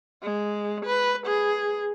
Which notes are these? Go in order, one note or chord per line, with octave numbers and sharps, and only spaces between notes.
G#3
B4
G#4